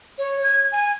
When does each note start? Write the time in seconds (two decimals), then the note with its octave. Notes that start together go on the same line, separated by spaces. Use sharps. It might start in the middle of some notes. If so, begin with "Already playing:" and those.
0.18 C#5
0.43 G#6
0.72 G#5